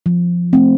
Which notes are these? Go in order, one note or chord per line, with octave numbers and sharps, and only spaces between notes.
F3
A3 C4